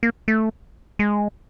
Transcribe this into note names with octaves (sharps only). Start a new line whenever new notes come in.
A#3
A3
G#3